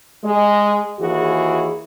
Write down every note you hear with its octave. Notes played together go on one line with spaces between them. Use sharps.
G#3
D#2 E3 F#4 G#4